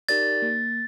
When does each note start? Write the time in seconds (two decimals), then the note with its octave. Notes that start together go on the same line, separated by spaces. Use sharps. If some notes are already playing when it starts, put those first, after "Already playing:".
0.09 D#4 G4 A#4 D5 A6
0.42 A#3